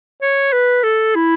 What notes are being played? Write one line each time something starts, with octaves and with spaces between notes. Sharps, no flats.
C#5
B4
A4
E4